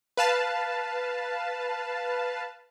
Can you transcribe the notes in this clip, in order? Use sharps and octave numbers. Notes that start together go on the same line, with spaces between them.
B4 F5 A5